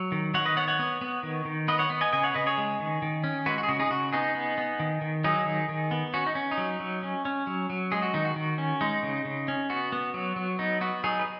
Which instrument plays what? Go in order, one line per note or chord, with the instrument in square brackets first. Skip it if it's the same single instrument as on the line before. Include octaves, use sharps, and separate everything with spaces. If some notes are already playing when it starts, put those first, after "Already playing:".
Already playing: [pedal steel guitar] F#3
D#3
D#3 C#5 F#5
B4 D#5
B3 C#5 F#5
C#5 F#5
B3
B3
D#3
D#3
B3 B4 D#5
C#5 F#5
B3
D#5 G#5
C#3 D#5 G#5
C#5 F#5
C#3 B4 D#5
G#4 C#5
G#3
D#3
D#3
C#4
G#3 F#4 B4
F#4
G#4
C#3 F#4
D#4 G#4
C#3 F#4
B3 D#4 G#4
B3
B3
D#3
D#3
F#3 D#4 G#4
D#3
D#3
B3
C#4 F#4
D#4
C#4
D#4
F#3
F#3
C#4
C#4
F#3
F#3
G#3 G#4
F#4
D#3 D#4
F#4
D#3
C#4
G#3 D#4
C#3
C#3
C#4
B3 F#4
B3
F#3
F#3
B3 D#4
B3 F#4
F#3 D#4 G#4
B4